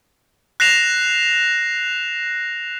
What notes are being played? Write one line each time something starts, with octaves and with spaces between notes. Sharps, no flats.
F#6 A#6 C7 E7 F7